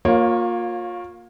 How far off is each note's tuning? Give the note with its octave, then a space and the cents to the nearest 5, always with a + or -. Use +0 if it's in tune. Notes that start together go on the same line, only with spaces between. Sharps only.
A#3 +0 F4 +25 C#5 -20